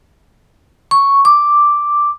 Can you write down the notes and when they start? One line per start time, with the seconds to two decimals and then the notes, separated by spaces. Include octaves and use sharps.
0.91 C#6
1.25 D6